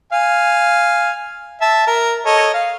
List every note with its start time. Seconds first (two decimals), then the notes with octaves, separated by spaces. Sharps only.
0.13 F5 G#5
1.61 E5 A5
1.87 A#4
2.26 A4 C#5 D#5
2.54 F5